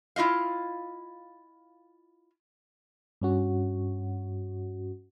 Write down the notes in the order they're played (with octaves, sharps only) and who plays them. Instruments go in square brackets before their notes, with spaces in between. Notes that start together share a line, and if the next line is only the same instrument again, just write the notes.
[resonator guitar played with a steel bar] E4 F4 D#5 F5
[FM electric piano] G2 C#4 F#4